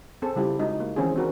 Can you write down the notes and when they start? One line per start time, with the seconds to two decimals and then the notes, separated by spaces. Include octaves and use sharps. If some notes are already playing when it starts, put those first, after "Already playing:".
0.22 C4 G#4 A4
0.36 C#3 G3 E4 F4 G4
0.59 G#3 D#4 F#4
0.80 A#3
0.96 D#3 E3 C4 C#4 F4 G#4
1.15 C4 D4 F#4 A#4